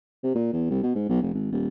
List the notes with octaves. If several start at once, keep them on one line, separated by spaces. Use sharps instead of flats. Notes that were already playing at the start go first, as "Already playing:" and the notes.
C3
A#2
E2
C2
B2
G#2
B1
F1
G#1
D#1